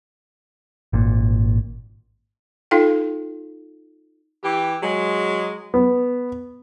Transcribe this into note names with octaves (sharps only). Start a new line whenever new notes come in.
G#1 A#2
D#4 F4 A4 F5 G5
E3 G4
F#3 G#3
B3